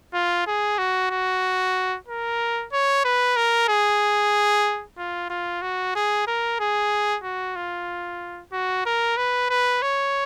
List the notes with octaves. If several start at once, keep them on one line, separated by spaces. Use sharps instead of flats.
F4
G#4
F#4
F#4
A#4
C#5
B4
A#4
G#4
F4
F4
F#4
G#4
A#4
G#4
F#4
F4
F#4
A#4
B4
B4
C#5